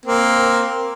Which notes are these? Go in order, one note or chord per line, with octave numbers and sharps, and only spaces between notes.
A#3 C4